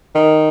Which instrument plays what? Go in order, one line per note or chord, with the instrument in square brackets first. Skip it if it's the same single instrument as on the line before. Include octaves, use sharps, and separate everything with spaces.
[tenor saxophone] D#3